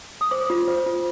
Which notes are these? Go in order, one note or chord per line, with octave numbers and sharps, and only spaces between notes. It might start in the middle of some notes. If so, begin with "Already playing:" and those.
D#6
C5 D6
F4
C5
F4